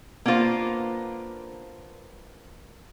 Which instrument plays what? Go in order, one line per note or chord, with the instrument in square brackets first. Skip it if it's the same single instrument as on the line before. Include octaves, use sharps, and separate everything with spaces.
[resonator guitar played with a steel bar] A#3 B3 D4 F4 C5